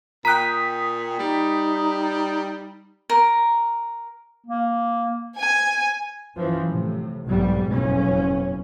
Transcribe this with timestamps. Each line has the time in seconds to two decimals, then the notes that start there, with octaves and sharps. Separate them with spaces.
0.25 A#2 G5 A#5 D#6 F#6 B6
1.19 G3 D#4
3.10 A#4
4.46 A#3
5.38 G#5
6.35 F#2 E3 F3
6.68 A2 C3
7.27 B1 F2 G#2 B2 G3
7.67 F#1 F2 B2 C#4